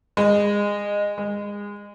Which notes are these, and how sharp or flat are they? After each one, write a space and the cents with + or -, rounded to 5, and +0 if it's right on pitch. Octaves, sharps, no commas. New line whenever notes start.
G#3 -20
G#3 -25